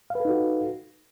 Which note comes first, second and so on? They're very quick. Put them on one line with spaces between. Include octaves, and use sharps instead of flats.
F5 B4 A4 D#4 F#4